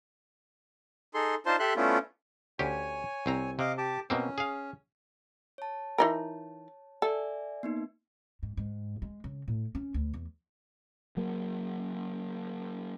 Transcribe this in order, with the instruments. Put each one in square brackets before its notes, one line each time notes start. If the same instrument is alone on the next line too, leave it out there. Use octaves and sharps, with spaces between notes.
[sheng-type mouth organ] D#4 G#4 A4 C6
D4 D#4 F4 C5 A5 C6
G4 A4 E5 C6 F#6
A3 B3 C#4 D4 E4 F4
[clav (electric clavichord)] D2 C#4 G4 [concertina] C#5 G#5
[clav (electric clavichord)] C2 C4 A#5
[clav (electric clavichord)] C3 [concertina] D#5 F5 D6
[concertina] G4 A5 D6
[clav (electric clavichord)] B2 A#3 C4 [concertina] C#4
[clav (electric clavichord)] G#4 F5
[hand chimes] C#5 A5
[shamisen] E3 D#4 A#4
[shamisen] A4 [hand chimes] D5 E5 G#5
[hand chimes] A#3 B3 D#4
[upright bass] G#2
G#2
G#3
C#3
A2
C#4
D2
E2
[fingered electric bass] F#3 A#3